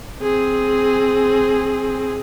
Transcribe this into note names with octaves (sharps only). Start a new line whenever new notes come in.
C4 G#4